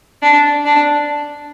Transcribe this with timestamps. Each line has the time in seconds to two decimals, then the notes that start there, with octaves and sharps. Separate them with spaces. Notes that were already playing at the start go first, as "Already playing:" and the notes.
0.22 D4
0.65 D4